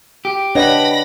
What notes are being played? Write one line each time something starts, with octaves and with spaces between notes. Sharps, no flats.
G4
D4 B4 C#5 D#5 F#5 G5 B5 A#6